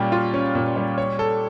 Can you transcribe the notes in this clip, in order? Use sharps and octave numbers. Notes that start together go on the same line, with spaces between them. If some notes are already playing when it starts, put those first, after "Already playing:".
Already playing: A#2 G3 C#4 F4
F4
C#4
A#2
G3
C#5
A4